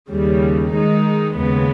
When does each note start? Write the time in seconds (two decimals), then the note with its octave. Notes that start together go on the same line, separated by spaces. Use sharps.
0.11 D#2 C#3 G3
0.74 D#3 G#3 D#4
1.37 D#2 C#3 G#3 B3